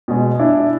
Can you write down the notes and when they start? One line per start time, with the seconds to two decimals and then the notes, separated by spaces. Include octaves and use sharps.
0.08 B2 G#3
0.39 D4 E4